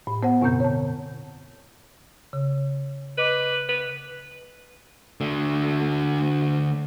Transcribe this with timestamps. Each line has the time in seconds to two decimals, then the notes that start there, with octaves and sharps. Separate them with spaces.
0.07 A2
0.23 B3 C5 F#5
0.42 F#2 B2 D3 C4 G6
0.60 C#5 A5
2.33 C#3
3.18 B4 D#5 D6
3.69 B4
5.20 D3 A3